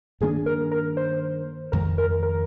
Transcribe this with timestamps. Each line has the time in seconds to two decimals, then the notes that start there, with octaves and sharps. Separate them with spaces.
0.21 G2 D#3 A#3 D4 G#4
0.46 A#4
0.71 A#4
0.97 C5
1.72 F2 D#3 G#3 A#4
1.98 A#4
2.23 A#4